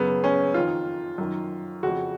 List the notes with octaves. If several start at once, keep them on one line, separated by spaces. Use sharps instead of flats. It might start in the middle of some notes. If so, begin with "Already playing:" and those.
Already playing: F#2 C#3 B3
C#4
F2 D#3 F4
F#2 D#3
F2 C#3 F#4